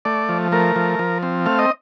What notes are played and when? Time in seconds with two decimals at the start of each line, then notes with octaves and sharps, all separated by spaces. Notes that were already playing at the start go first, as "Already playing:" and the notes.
0.05 A3 D5
0.29 F3
0.52 A3 A#4
0.76 F3
0.99 F3
1.23 C4
1.46 A3 F5
1.59 D#5